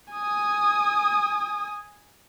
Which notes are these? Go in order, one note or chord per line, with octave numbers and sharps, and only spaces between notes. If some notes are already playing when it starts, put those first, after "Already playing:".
G#5 D#6